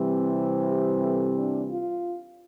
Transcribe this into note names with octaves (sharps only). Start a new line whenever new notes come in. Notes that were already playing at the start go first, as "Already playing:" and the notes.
Already playing: C3 E3 G3 C4
G4
A4
D4
F4